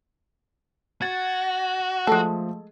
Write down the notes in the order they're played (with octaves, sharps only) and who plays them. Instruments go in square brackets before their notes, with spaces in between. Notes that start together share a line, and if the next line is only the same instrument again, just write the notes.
[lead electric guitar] F#4 [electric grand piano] G#6 A6
[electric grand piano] F3 A3 [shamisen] G#3 A4